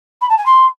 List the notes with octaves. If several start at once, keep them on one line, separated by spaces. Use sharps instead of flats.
B5
A5
G#5
C6